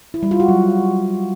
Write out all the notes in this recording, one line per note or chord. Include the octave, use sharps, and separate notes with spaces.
E4
G3
F4
F#4
F#3